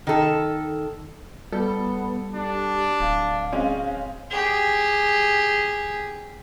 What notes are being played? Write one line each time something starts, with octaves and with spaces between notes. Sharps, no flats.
D#3 A4
G3 B3 A4
D4 G4
D1 F5
G#3 C4 C#4
G4 G#4